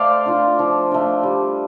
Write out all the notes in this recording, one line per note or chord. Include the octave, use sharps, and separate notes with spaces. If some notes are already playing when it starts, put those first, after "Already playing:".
Already playing: A3 C5 D5 F5
D4 F4
F3
A3 D4
G3